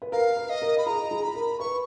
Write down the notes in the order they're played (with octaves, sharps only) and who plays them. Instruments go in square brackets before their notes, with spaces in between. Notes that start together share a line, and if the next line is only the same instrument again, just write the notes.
[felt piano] B4
[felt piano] A#4 [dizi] F5
[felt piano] B4
[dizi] D#5
[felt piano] A#4
[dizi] B5
[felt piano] G#4 [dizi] A#5
[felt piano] G#4
[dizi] B5
[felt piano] A#4
[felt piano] B4 [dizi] C#6